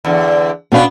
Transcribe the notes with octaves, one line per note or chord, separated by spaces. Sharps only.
E2 D3
B2 B3 C#4 D4 B4 F5